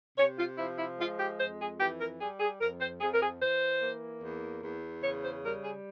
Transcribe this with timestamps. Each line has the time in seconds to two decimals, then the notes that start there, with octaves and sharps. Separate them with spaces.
0.18 C3 C#5
0.39 F4
0.58 F3 E4
0.78 E4
0.99 G#3 F4
1.19 G4
1.39 F2 C5
1.60 G#4
1.80 E3 G4
1.99 A#4
2.20 G3 G#4
2.40 G#4
2.61 F2 A#4
2.80 C5
3.01 F2 G#4
3.13 A#4
3.21 G#4
3.41 E3 C5
3.82 A#3
4.22 E2
4.63 E2
5.03 C#3 C#5
5.23 C5
5.44 G3 A#4
5.63 G#4